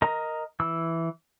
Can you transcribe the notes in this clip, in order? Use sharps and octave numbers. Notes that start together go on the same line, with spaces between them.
A#4 D#5 A#5
E3 E6